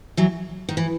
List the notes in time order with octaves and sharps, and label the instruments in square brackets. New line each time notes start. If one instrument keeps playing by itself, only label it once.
[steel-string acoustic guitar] E3 F#3
D#3
E3